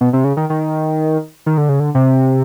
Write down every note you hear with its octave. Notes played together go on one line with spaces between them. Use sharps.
B2
C3
C#3
D#3
D#3
D#3
D3
C#3
D3
C3